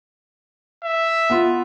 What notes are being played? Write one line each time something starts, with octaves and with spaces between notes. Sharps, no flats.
E5
B3 F4